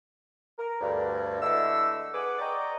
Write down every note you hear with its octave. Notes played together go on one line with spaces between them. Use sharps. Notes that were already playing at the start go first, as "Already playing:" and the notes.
A#4
D2 G2
D3 G#3 A3 E4 E6
G#4 B4 F#5 D6
D5 D#5 G5 A#5 C#6 D6